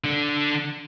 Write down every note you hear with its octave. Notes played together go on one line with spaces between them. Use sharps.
D3 D4